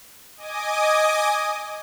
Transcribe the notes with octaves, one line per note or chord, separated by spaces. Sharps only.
D#5 G#5 D6 D#6